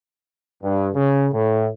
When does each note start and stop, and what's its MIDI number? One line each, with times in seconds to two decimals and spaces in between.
0.63 0.89 43
0.95 1.28 49
1.34 1.68 45